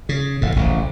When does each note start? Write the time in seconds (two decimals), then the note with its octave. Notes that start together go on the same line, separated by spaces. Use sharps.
0.09 C#3
0.41 E1 A2
0.56 D1 A1 C#3